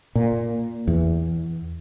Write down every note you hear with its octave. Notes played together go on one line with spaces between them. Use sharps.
A#2
E2